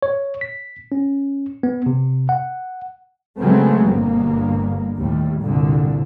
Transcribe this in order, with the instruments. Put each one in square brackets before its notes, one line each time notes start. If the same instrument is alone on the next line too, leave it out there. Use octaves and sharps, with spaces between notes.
[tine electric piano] C#5
B6
C#4
B3
C3
F#5
[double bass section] C#3 F#3 G#3 A3 B3 C4
G1 G2 B2 A#3
D#2 A2 G3
C2 G2 A#2 D3